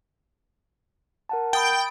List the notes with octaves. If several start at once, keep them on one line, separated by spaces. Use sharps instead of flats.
A#4 F#5 A5
G5 B5 D#6 A6